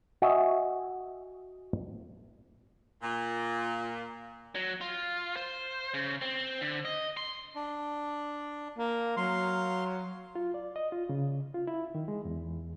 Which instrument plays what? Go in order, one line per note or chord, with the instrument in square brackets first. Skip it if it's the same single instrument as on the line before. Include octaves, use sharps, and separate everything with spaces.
[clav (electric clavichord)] F#4 D#5 E5 G#5
[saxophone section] A#2
[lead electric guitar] F#3
F4
C5
C#3
C4
D3
D#5
C6
[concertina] D4
[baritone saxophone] A#3
[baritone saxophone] F#3 [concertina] F5 C6
[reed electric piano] F4
D5
D#5
F4
C#3
F4
E4
D#3
G#3
E2